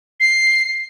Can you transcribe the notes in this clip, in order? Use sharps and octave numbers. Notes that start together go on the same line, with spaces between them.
C7